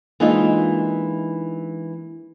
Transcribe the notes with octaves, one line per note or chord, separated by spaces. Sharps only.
E3 G#3 A#3 D4 D#4 F4